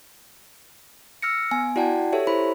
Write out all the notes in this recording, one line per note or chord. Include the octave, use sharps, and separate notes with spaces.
E6 F6 A#6 C#7
B3 G#5
E4 F#4 D5 F#5 G5 A5
G4 A4 C#5 E5
E4 C5 B5